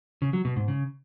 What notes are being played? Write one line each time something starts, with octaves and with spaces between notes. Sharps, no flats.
C#3
F#3
B2
G#2
C#3